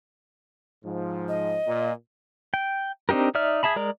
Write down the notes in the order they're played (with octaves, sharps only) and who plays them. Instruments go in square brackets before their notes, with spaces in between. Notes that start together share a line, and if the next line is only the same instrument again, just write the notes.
[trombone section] G#2 F3
[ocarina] D#5
[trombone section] A#2
[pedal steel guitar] G5
C4 D4 D#4 G4 A#4
D#4 D5 E5 F6
G#4 E5 A5 B5
G#3 A#4 D5 A#5